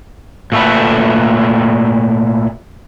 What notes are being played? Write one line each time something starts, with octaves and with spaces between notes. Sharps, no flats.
A#2 A3 A4 B4